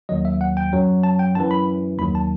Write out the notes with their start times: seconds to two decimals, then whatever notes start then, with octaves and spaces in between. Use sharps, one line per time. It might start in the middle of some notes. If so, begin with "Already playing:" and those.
0.09 D#2 D#3 F#3 D#5
0.25 E5
0.41 F#5
0.57 G5
0.73 F#2 F#3
1.03 A5
1.19 G5
1.35 F#2 E3 A5
1.51 B5
1.98 D#2 D#3 F#3 B5
2.15 A5